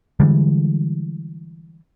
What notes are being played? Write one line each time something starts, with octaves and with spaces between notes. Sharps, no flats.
D3 E3 G3 G#3